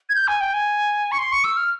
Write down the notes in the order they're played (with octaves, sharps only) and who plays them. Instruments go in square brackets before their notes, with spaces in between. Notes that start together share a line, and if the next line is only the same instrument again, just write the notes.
[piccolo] G#6
G6
G#5
G5
G#5
C#6
C6
C#6
E6
F6